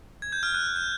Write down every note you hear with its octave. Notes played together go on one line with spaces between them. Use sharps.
G#6
G6
F6
F#6
G6